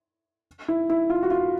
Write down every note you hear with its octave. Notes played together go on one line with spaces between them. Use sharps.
E4
E4
F4
F#4
F4